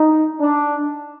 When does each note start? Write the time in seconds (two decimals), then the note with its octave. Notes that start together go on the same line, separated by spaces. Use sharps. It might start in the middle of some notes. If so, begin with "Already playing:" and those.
Already playing: D#4
0.41 D4